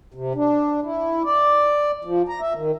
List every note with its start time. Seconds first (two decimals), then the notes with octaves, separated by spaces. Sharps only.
0.14 C3
0.35 D4
0.84 E4
1.24 D5
2.05 F3
2.29 A#5
2.41 E5
2.55 D#3